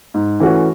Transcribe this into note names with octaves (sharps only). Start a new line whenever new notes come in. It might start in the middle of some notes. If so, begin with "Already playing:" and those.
G#2
E3 A3 C#4 F#4